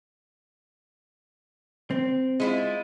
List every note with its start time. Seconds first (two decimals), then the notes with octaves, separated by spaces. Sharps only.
1.91 C4
2.40 G#3 E4 F4